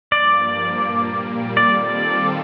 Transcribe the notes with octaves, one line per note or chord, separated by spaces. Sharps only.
G2 F3 A#3 D5
A#2 G3 A#3
D#3 G3 C4 F4 A4 D5